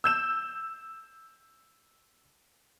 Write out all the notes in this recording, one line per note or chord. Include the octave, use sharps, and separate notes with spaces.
E6 G6 E7